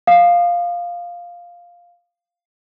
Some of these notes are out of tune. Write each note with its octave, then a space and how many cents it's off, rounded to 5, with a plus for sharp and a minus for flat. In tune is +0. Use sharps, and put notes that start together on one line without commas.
F5 +0 D#6 -35